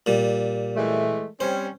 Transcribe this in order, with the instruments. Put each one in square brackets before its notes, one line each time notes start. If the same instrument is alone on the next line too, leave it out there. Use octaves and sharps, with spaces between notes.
[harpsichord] A#2 G3
[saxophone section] E3 G#3 A3
[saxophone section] G3 C4 C#4 [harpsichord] C5